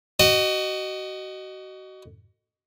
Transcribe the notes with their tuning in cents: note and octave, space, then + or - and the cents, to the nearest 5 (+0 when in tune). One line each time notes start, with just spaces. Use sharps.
F#4 +30 D#5 -15